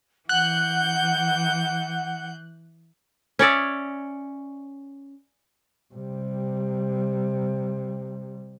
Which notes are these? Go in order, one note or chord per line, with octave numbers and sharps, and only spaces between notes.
E3 F#5 F#6 G6
C#4 C#5 D5 E5
C3 G3